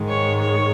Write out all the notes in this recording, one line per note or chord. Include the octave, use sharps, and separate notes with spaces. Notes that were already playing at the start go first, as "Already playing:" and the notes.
Already playing: G#2 D#3 G#3
C#5
C#5